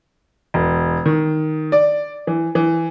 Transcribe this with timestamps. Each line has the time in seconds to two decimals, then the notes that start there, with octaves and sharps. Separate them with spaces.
0.54 E1
1.06 D#3
1.72 D5
2.27 E3
2.55 E3